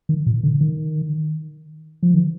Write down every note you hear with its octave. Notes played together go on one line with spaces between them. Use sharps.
D#3
A#2
D3
D#3
F3
D#3